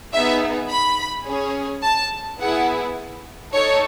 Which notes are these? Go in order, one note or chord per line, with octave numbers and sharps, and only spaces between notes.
B3 D#4 G#4 E5
B5
C#4 G#4
A5
B3 E4 G#4 F#5
D#4 A4 C#5